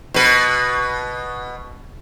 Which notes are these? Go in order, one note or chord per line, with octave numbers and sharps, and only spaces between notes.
B2 B4